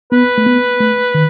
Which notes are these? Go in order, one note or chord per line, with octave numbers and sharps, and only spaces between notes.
B3 B4
A3
B3
A3
D#3